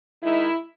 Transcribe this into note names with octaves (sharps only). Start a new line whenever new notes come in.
D#3 G#3 D#4 E4